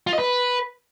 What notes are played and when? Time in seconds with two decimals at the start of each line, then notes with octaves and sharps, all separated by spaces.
0.07 F4
0.13 D#5
0.19 B4